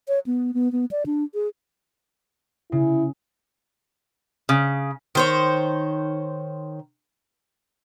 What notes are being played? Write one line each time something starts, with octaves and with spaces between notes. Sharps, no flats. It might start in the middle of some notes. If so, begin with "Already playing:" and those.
C#5
B3
B3
B3
D5
D4
G#4
C#3 E4
C#3
D#3 C5 C#5